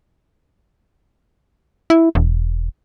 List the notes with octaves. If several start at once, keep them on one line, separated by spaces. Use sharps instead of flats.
E4
E1